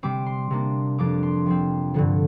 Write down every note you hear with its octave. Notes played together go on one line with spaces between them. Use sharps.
C3 G3 C4 D6
C6
C3 A#3 D4
F2 F3 D4 D6
C6
C3 F3 C4
G2 D3 F3